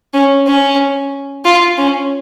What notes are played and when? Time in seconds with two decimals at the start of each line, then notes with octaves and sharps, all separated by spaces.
0.14 C#4
0.47 C#4
1.45 F4
1.78 C#4